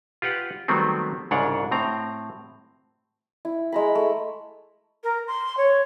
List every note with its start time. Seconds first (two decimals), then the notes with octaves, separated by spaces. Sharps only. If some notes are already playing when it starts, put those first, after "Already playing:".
0.22 F4 G4 B4 F#5
0.68 D#3 F#3 G3 A3 B3 C4
1.31 C2 G#2 C#3 D4 C#5 F#5
1.71 A2 C4 A#5
3.45 E4
3.72 G#3 A#5 B5
3.95 A3
5.03 A#4
5.27 C6
5.57 C#5